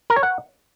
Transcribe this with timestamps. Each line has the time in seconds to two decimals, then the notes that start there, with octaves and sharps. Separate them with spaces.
0.10 A#4
0.16 C#5
0.23 F#5